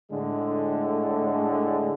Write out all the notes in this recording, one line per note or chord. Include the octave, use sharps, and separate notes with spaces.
A2 D3 G#3